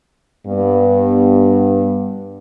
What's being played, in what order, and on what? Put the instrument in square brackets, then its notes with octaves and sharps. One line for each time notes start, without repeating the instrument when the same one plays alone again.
[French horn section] G2 B3